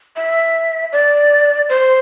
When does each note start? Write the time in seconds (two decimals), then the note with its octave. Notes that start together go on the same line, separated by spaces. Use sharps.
0.16 E5
0.92 D5
1.69 C5